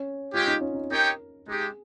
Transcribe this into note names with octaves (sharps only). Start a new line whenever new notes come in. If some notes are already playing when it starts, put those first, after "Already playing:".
Already playing: C#4
G#3 C#4 F4 G4
D#4
C#4
D#4
D#4 G4 A#4 C#5 G5
G#3 D#4 G4 G#4